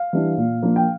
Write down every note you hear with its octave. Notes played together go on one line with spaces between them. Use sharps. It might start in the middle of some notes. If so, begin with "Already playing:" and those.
Already playing: F5
E3 G3 D4
A#2
F3 A#3 D4
G5